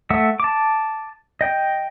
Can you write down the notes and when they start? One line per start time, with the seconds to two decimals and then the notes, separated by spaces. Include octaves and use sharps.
0.10 A3 E5 F#5 E6
0.40 A5 D6
1.41 D#5 G5